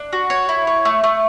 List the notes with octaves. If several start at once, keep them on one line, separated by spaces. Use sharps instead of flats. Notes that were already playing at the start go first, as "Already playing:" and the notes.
Already playing: D4
F#4
C#5
E4
C#5
A3
A3